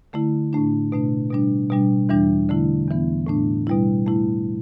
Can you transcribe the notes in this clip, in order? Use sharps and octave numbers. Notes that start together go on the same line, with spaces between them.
D3 A3 E4
A2 A3 D4
B2 A3 D4
B2 G3 D4
B2 G3 D4
E2 E3 G3 D4
D3 A3 E4
E2 E3 B3
A2 A3 D4
B2 G3 E4
A2 A3 E4